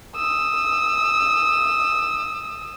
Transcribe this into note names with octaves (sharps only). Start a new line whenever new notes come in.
D#6 E6